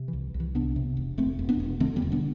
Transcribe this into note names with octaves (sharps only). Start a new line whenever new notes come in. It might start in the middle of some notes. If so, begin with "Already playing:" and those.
Already playing: C3
E3
C2
C2
E3
C3 B3 D4
C3
E1
E1 A3 C4
E1
B3 D4
E1
D3 A3 C4
G3 B3
E1
B3 D4